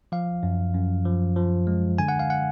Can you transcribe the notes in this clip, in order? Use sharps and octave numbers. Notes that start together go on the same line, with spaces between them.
F3 F5
F#2
F#2
F3
F3
G#3
D3 G#5
F#5
F5
F#5